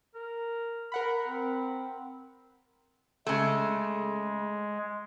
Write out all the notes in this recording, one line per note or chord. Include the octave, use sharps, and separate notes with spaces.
A#4
A#4 F#5 B5
C4
C#3 G#3 A3